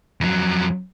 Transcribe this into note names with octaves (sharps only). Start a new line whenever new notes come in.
F2 F#3